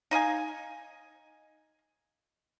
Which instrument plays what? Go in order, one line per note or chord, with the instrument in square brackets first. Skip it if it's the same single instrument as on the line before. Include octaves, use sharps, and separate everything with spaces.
[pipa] D#4 D#5 F5 G#5